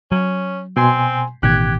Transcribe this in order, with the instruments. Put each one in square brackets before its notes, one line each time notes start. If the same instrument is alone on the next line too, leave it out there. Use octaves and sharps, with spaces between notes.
[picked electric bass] F#3 [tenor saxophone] C#4
[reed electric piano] B2 G#5 C6 [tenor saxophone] C4
[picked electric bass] A1 B2 D#3 [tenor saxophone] G4 [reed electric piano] F#6 G#6